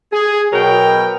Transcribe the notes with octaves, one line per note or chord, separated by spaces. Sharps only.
G#4
B2 F#3 A#4 G5